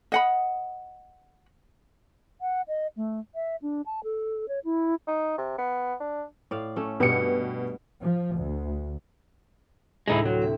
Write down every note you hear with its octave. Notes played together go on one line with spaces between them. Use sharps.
D#5 F#5 B5
F#5
D#5
A3
E5
D4
A5
A4
C#5
E4
D#4
C3
B3
D4
A2 D5 F5
A3 C#4
G2 B2 B3 G4 C#7
F3
D2
D2 A2 C3 G#3 D#4 E4
F#3 C4
E5